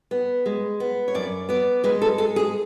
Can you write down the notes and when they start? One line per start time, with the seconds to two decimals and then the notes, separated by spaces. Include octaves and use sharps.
0.11 B3
0.46 G#3
0.80 B3
1.08 C#5
1.15 F#2 D5
1.49 B3 D5
1.84 G#3 B4
2.02 A4
2.18 G#3 A4
2.36 G#4